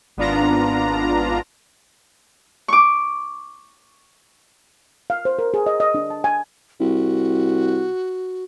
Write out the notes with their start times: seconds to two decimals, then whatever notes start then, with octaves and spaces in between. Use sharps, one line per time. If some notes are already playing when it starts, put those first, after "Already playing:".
0.17 G#1 B3 D4 F4 A#5
2.68 C#6 D6
5.10 F5
5.25 C5
5.39 A#4
5.54 G#4
5.66 D#5
5.80 D#5
5.95 D4
6.10 A5
6.24 G#5
6.80 C2 F#4